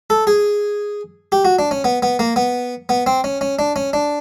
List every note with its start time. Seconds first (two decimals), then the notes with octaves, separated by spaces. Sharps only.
0.10 A4
0.27 G#4
1.32 G4
1.45 F#4
1.59 D4
1.71 C#4
1.84 B3
2.03 B3
2.19 A#3
2.36 B3
2.89 B3
3.06 C4
3.24 C#4
3.41 C#4
3.59 D4
3.76 C#4
3.93 D4